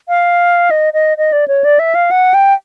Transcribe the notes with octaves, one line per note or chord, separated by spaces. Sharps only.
F5
D#5
D#5
D#5
D5
C#5
D5
E5
F5
F#5
G5